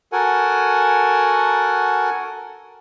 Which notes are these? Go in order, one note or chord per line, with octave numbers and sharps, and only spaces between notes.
F#4 A4 A#4 F#5 G#5